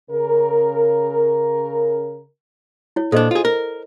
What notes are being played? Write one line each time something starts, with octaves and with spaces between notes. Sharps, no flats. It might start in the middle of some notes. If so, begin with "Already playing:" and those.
C#3 A#4
E4 C#5
A#2 D4 A4 C5 D#5
F4 G#4
A#4